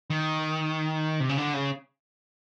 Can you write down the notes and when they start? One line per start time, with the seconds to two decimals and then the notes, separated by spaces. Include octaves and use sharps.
0.10 D#3
1.20 C3
1.29 C#3
1.38 D3
1.54 C#3